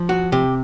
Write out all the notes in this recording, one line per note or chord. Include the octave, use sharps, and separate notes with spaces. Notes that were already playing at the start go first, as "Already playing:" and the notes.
Already playing: F3
F#4
C3 G4